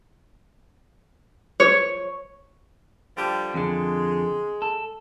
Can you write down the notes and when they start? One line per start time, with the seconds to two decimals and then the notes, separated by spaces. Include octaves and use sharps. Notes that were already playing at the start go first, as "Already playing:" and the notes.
1.60 C#5
3.16 D3 F3 G3
3.54 F2 D3 G#3
4.62 A4